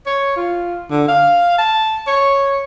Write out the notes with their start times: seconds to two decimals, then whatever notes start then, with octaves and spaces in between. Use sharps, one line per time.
0.06 C#5
0.36 F4
0.91 D3
1.08 F5
1.58 A5
2.07 C#5